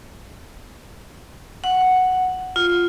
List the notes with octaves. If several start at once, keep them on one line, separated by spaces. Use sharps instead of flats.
F#5
F4